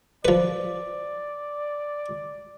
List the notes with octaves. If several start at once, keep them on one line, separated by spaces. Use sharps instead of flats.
F3 B4 D5